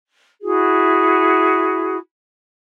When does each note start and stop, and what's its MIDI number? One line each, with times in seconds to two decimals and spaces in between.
0.41 1.96 64
0.41 1.96 66
0.41 1.96 68